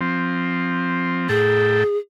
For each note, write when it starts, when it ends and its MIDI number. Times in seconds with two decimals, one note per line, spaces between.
0.01 1.28 53
0.01 1.28 60
1.29 1.84 45
1.29 1.97 68
1.29 1.84 69
1.29 1.84 79